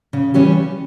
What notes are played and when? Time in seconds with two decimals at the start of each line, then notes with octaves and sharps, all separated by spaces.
0.13 C#3
0.34 E3 G3 C#4 G4